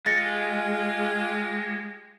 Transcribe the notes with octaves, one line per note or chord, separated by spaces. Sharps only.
G#3 F4 G4 G#4 A6 A#6 C#7